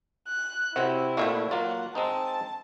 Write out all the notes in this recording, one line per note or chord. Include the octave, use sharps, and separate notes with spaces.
F#6
C3 C4 E4 F#4 C#5 F#5
A#2 A3 F#4 C5 E5 F5
F#3 A#3 F4 D5 F#5
G#3 C4 D#4 A5